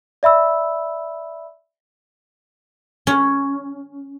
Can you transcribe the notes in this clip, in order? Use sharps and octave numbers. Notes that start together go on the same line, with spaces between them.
D5 E5 B5 E6
C#4